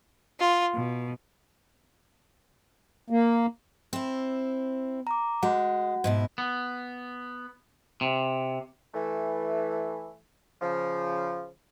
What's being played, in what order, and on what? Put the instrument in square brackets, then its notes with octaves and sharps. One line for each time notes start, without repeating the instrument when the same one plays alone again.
[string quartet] F4
B2
[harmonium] A#3
[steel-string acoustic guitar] C4 E4
[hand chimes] A#5 D6
[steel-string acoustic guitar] G#3 [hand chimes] F#4 F#5
[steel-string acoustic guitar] G#2 B2 E4
[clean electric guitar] B3
C3
[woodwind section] E3 A3
C#3 F3